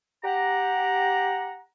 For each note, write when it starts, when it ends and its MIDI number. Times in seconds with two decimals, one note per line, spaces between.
0.24 1.60 67
0.24 1.60 78
0.24 1.60 82